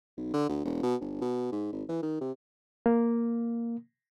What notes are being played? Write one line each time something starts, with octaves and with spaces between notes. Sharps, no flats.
B1
D3
D2
E1
B2
G1
B2
G#2
G#1
E3
D#3
C3
A#3